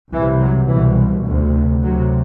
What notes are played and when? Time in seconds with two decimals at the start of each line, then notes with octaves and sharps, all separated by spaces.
0.11 C2 C3 E3
0.40 F#3
0.69 C2 B2 E3
1.26 D2 C3
1.82 D2 C3 F#3